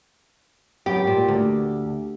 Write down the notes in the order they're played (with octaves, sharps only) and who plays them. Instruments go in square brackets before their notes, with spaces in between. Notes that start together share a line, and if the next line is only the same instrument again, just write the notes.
[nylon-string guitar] F#2 B3 [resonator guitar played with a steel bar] G4
[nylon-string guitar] A#2
D2